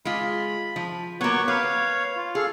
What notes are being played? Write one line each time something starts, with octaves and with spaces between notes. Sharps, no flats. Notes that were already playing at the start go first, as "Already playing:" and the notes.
G#3 F4 B5
F3
F#3 A#3 B3 C#5 C#6
B4 C#5 F5
F4
G#4 A4 F5